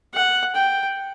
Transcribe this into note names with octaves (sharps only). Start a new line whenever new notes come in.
F#5
G5